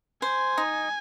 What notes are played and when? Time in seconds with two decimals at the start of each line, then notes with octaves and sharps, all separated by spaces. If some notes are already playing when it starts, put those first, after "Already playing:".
0.22 C5 G#5
0.58 D#4